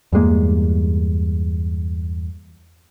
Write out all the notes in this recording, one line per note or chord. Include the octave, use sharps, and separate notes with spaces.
E2 G2 G#3 A#3